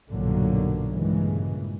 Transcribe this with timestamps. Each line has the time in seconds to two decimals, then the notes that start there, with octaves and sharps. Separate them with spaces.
0.11 B1 G2 A#2 D3 F#3 A#3
0.93 G2 A#2 C#3 E3 G#3